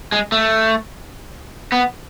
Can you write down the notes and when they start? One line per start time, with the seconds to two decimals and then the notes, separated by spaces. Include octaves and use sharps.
0.12 G#3
0.32 A3
1.72 B3